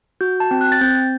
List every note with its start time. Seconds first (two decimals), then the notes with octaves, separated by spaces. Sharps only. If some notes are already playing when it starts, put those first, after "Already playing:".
0.21 F#4 G6
0.40 A5
0.51 C4
0.61 F#6
0.72 A6
0.81 C4 G6